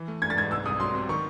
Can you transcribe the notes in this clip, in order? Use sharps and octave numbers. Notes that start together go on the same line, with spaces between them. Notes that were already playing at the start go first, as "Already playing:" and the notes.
Already playing: E3
A3
A3 G#6
A6
G#2 G#6
C2 E6
C2 D#6
F#3 C6
C3
D#3 C#6